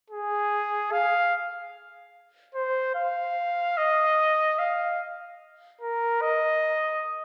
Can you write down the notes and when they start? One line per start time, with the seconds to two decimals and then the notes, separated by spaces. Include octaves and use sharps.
0.11 G#4
0.92 F5
2.55 C5
2.95 F5
3.77 D#5
4.59 F5
5.81 A#4
6.22 D#5